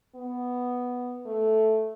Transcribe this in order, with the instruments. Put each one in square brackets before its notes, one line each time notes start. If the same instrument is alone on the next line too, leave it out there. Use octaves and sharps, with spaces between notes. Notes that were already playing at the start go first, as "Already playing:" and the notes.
[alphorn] B3
A3